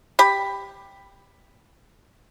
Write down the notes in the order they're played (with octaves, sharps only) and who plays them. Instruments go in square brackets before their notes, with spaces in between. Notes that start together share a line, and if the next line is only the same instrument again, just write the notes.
[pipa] G4 B5